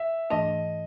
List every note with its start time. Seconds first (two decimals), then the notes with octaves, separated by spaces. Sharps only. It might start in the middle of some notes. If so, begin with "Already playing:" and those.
Already playing: E5
0.30 G#2 E3 A3 D4 D#5